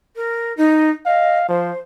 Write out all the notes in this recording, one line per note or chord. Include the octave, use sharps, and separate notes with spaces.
A#4
D#4
D#5 F5
F3 C5